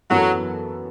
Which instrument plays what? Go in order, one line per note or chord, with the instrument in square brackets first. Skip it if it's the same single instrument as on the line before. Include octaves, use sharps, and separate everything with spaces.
[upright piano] F#2 E3 B3 F#4 A4 [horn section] F#3